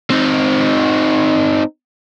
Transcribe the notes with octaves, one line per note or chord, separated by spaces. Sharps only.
C4 D#4